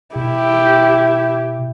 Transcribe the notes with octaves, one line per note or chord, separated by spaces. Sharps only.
B2 E4 G4